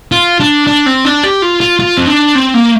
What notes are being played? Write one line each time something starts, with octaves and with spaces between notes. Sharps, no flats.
F4
D4
D4
C4
D4
G4
F4
F4
F4
C4
D4
C4
A#3